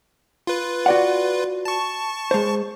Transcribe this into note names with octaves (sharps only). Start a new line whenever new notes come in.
F4 B4
F#4 D5 F#5
A5 C#6
G#3 C5